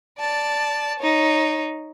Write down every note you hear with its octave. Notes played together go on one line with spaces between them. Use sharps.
D5 A5
D#4 C#5